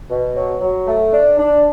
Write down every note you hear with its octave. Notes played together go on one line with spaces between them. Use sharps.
B2
F#3
F#3
A3
D4
D4